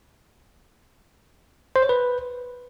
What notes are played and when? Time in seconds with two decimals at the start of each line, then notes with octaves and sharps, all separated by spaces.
1.76 C5
1.82 C#5
1.89 B4